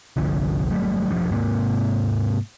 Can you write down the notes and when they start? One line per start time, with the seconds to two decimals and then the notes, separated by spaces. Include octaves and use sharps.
0.17 G1 C2 D3 F3
0.69 G1 F#3 G3 A3
1.09 E1 G2 F3
1.31 G#2 C3 A#3